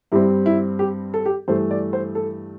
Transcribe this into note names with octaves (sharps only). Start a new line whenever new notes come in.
G2 G3 C4 E4
E4
G4
A4
G4
G2 E3 A3 C5
D5
C5
A4